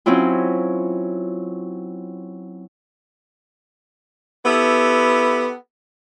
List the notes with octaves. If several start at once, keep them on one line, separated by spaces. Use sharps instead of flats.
F#3 C4 C#4 E4 F4
B3 E4 G4 A4 B4